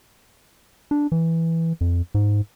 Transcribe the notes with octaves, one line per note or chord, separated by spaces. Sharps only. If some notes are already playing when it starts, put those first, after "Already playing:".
D4
E3
F2
G#2